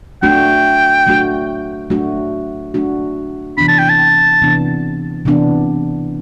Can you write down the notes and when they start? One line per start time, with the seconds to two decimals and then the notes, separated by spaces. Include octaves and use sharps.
0.22 F#3 A3 D4 F#4 G5
1.07 F#3 A3 D4 F#4
1.90 F#3 A3 D4 F#4
2.74 F#3 A3 D4 F#4
3.58 C3 E3 B3 D4 B5
3.68 A5
3.79 G5
3.89 A5
4.42 C3 E3 B3 D4
5.25 C3 E3 B3 D4